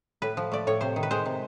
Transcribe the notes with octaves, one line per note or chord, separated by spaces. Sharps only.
A2 B4
F3
A3 D5
A2 C#5
C3 C5
D#3
B4
G#3 C5
C3